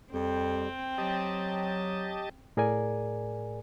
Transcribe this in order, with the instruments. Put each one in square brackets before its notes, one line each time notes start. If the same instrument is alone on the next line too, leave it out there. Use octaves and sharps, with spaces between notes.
[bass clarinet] F2 [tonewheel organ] G3 [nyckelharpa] C4 G5
[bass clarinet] F#3 [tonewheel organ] G4 D#5 A5
[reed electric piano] A2 G#4 A#4 D5 G#5